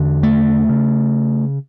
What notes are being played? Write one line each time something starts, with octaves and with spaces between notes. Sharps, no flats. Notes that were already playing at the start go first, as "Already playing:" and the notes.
Already playing: E2 D3
A3
C#3